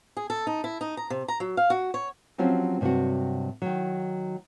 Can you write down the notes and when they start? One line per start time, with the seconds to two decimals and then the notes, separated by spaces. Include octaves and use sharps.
0.17 G#4
0.30 A4
0.47 D#4
0.64 E4
0.81 D#4
0.97 A#5
1.10 C3
1.28 A#5
1.40 F#3
1.57 F5
1.70 F#4
1.94 C#5
2.38 F3 F#3 C4 C#4 F4 G4
2.81 G2 C3 E3 F#3 F#4
3.62 D#3 F#3